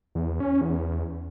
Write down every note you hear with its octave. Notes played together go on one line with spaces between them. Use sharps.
E2
C#4
E2